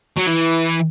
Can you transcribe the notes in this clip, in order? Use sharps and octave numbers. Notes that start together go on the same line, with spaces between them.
F#3
E3